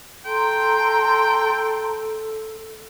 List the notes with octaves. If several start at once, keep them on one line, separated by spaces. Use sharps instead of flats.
A4 G5 A5 A#5 C6